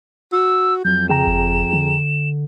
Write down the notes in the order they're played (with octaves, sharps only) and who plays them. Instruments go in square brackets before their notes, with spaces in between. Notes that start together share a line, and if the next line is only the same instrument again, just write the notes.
[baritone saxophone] F#4 [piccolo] E6
[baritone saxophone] F2 [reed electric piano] F#3 [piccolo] G6
[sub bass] C#3 [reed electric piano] G#4 G5 A#5 [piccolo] E7
[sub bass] F#1
D3